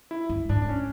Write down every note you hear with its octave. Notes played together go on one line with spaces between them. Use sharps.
E4
G2
G#2 D4
D4
C#4